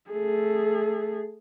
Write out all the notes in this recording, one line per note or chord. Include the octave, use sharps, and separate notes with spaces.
A3 G#4